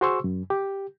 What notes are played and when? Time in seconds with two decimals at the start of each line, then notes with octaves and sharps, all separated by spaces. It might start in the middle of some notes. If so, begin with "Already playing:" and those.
0.01 F#4 G#4 C5 C6 C#6 E6
0.24 F#2
0.50 G4